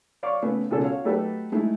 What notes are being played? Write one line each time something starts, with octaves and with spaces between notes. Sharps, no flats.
C#5 D5 F5 C#6 D6
C#3 A3 B3 C#4
C#2 B2 A4
F#4 C#5 F5
F#3 A3 D#4 G4 A4 B4
G#3 A3 D#4 E4